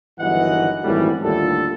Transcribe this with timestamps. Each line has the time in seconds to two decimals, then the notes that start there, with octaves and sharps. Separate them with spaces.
0.20 G1 D#3 E3 F#3 D#5 F#5
0.84 G#1 F#2 A2 E3 G3
1.23 D#2 A2 D3 G3 F4 A4